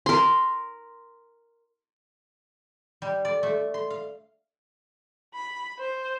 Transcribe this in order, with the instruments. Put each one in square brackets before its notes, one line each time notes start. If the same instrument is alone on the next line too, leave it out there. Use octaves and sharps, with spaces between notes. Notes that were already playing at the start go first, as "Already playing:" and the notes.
[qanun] A#4 C6
[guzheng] G3
D5
A3
C6
F5
[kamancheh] B5
C5